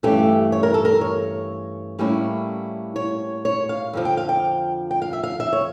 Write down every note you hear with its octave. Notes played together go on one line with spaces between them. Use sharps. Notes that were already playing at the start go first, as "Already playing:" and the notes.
G2 E3 A3 C#4 G4
C#5
A#4
A4
A#4
C#5
A2 G3 A#3 C#4 E4
C#5
C#5
F5
F2 D3 F3
G5
F5
G5
G5
F5
E5
F5
E5
C#5